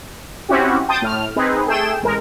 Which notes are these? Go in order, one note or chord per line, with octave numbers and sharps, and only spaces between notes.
C4 C#4 E4 F#4 G4
G5 A5 C6 D#6 G6 A6
A2 F6
C4 D#4 G#4 B4
A3 G#4 A4 G5 E7
A1 G#3 A#4